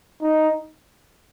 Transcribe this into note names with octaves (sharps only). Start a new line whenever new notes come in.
D#4